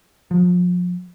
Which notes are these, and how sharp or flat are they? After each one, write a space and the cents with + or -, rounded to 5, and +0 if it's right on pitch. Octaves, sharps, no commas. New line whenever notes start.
F3 +35